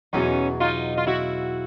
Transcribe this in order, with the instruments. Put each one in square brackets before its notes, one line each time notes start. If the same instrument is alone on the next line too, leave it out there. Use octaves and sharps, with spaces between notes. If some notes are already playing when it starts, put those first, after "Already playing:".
[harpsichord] E2 B2 F#3 [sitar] C#4 D#4
[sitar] D#4 F4
F4
E4 F#4